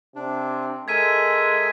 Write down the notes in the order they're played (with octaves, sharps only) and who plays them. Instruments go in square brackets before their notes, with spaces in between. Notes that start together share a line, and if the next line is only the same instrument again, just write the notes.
[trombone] C3 [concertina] D4
[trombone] G#3 [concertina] A4 A#4 E5 [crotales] G#6 B6 D#7